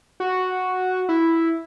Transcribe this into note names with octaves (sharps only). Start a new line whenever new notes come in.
F#4
E4